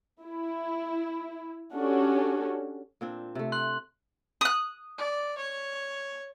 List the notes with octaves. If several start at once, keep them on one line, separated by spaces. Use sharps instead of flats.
E4
C#4 D4 F#4 G4 A4
A#2 C4 D4
C3 A3
C6 F#6 F#7
D#6 F#6
D5
C#5